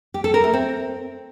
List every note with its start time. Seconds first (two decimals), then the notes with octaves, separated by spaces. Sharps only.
0.14 G4
0.24 A4
0.34 A#4
0.44 A3
0.53 C4